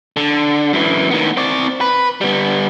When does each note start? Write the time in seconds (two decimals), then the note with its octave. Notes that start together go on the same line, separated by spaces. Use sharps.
0.17 D3
0.73 F#2 E3
1.11 D#3 B3
1.37 C4 D5
1.81 B4
2.21 G3 B3